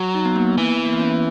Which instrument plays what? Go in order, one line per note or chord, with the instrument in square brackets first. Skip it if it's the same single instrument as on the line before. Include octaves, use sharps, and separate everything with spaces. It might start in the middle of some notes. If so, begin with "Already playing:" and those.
Already playing: [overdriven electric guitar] F#3
[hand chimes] D#4
B3
A#3
B3
[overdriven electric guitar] E3
[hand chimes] A#3
B3
C#4